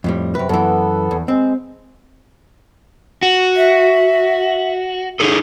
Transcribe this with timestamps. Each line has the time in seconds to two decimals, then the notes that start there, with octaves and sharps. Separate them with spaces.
0.04 F2 A2 G3
0.35 F#2 C3 B4
0.49 F#2 E3 B3 A4
1.11 E2
1.28 G#3 C4
3.23 F#4
3.56 E5
5.20 D#4 G#4 A4